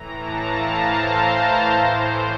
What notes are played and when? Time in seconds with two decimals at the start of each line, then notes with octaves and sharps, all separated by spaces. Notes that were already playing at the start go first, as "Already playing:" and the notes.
Already playing: A2 E3 A#5
0.17 A5
0.47 F5
0.77 C5
1.67 A2 E3